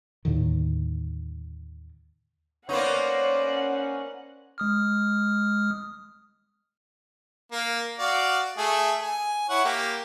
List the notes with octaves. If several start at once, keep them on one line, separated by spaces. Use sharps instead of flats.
D#2 A2 D3 D#3
A#3 B3 C#4 D#4 C5 D5 F#5
G#3 D#6 F6
A#3
F#4 D5 F5
A3 G#4
G#5
E4 C#5 F#5
A#3 G4